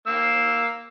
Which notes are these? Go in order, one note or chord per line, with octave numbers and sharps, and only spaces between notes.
A#3 E6